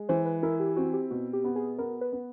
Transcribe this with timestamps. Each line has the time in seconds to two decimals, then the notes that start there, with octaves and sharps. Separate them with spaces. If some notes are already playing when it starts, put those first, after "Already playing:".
Already playing: G#3
0.09 E3 C5
0.25 B4
0.43 E4 A#4
0.60 G4
0.76 C4 F#4
0.93 G4
1.11 B2 F#4
1.33 G4
1.44 B3
1.56 G#4
1.79 B3 A#4
2.01 B4
2.13 B3